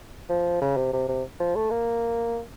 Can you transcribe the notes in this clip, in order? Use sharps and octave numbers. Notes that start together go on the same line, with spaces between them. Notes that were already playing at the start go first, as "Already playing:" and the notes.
F3
C#3
C3
C3
C3
F3
A3
A#3